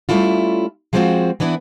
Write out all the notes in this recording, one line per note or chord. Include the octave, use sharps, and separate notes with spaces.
G3 A3 C#4 E4 F4
F3 G#3 B3 C4 F4 F#4
E3 B3 D4 E4